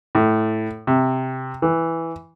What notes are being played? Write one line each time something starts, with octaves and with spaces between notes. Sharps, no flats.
A2
C3
E3